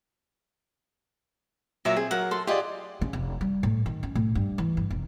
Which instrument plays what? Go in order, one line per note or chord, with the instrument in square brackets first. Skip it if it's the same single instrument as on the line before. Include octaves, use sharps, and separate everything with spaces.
[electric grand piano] A#2 F#3 [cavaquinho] A#4 E5
[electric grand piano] C4 [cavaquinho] G#4
[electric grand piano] F#3 A#4 [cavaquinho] F#5
[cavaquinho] A4 C6
[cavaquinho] F4 D#5 [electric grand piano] G4 G#4 D5
[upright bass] C#3
F1
G3
A2
D#3
C#4
A2
G2
E3
G2
F1